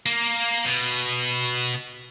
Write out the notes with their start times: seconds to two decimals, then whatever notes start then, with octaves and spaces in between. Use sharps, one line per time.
0.06 A#3
0.65 B2